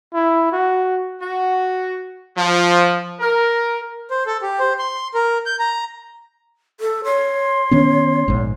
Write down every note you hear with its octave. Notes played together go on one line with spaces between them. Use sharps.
E4
F#4
F#4
F3
A#4
C5
A4
G4
C5
C6
A#4
G6
A#5
A4
C#5 C6
D#3 B3 C#4
A#1 G#2